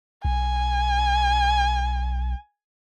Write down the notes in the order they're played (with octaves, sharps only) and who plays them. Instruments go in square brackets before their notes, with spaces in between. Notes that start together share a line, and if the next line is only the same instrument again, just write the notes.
[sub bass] B1 [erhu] G#5